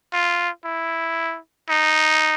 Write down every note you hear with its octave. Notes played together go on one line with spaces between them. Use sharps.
F4
E4
D#4